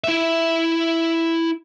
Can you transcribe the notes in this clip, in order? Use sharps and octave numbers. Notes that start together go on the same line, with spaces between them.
E4 E5